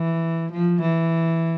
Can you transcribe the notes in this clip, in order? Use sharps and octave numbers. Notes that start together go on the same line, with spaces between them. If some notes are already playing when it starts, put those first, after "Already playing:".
Already playing: E3
F3
E3